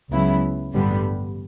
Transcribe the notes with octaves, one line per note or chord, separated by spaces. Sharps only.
C#2 C#3 F#3 B3 E4
A1 G2 D3 G3 B3